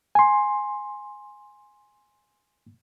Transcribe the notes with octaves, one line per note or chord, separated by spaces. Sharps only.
G#5 C6